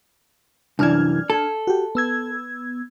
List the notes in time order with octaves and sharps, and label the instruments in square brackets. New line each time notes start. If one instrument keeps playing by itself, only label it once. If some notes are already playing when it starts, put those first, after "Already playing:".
[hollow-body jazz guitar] C2 F#2 E3 [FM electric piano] D4 F6 G#6
[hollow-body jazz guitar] A4
[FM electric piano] F#4 G4
B3 E6 G#6